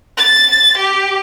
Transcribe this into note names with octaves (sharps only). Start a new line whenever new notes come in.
A6
G4